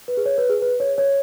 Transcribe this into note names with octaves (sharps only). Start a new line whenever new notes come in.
B4
G#4
C#5
B4
G#4
B4
C#5
C#5